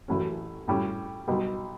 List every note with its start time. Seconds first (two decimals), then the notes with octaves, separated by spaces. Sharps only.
0.08 A1 A2 F#3 C#4
0.68 A2 G3 C#4
1.27 B1 B2 G3 B3